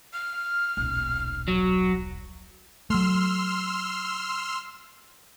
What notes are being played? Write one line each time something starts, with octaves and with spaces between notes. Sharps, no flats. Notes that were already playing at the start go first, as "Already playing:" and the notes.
F6
D#1 B1
F#3
F#3 A3 C6 E6 F6